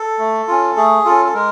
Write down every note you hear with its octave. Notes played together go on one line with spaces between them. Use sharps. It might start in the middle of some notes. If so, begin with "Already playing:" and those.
Already playing: A4
A3
C#4 F4
A3 G#4
C#4 F4 A4
A4
G#3 A#4